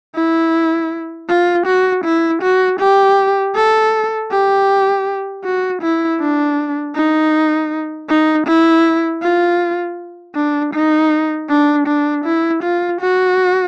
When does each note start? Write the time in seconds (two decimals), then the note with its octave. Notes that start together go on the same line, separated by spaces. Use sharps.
0.15 E4
1.29 F4
1.66 F#4
2.05 E4
2.42 F#4
2.80 G4
3.55 A4
4.31 G4
5.44 F#4
5.82 E4
6.21 D4
6.95 D#4
8.09 D#4
8.47 E4
9.22 F4
10.36 D4
10.74 D#4
11.49 D4
11.87 D4
12.25 E4
12.63 F4
13.01 F#4